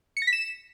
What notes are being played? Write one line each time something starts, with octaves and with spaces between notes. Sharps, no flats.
C#7
A#6
B6
E7